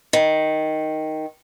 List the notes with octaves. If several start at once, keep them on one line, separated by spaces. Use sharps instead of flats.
D#3